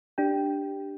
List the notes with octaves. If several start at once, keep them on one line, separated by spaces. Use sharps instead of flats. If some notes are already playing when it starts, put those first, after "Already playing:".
D4 G4 G5